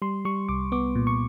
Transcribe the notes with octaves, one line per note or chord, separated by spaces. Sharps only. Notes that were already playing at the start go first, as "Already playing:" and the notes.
G3 C6
G3 C#6
C2 D6
B3 D6
A#2
C#6